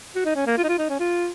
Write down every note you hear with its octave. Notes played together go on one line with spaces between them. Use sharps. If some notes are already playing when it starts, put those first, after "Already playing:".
F#4
D#4
C#4
A#3
F4
D#4
F4
D#4
C#4
F4